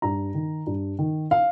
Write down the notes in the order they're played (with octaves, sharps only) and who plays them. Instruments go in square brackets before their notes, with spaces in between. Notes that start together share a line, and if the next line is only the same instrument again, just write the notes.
[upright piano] G2 A#5
D#3
G2
D#3
F5